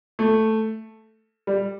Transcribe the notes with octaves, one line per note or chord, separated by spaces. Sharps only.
A3
G3